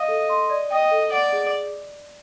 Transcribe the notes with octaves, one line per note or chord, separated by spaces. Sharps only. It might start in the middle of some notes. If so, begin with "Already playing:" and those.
Already playing: D#5 F5
A4
C6
D5
D#5 G5
A4
D5 F#5
G#4